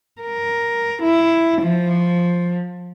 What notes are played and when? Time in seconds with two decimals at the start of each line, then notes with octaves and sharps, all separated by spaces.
0.22 A#4
1.03 E4
1.62 F3